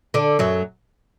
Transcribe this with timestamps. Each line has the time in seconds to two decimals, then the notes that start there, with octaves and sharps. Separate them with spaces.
0.14 D3 D4
0.39 F#2 F#3